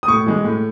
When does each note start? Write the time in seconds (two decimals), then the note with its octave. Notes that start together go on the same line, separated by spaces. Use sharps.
0.03 D#6
0.08 A2 C#6
0.26 E3 G#3
0.44 A2